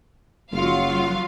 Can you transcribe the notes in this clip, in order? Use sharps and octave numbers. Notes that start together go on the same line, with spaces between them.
F#1 F#3 F4 F5